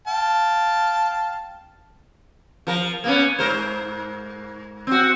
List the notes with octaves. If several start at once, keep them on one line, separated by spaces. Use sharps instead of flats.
F5 G5 A5
F3 A#4
A#3 B3 C#4
G#2 A#4 C5
C4 F#4